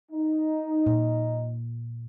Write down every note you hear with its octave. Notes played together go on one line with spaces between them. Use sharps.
D#4
A#2